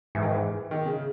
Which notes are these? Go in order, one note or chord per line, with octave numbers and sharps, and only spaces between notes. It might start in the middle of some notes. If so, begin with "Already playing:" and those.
G#2 E3
D#3
E3
D#3
C#3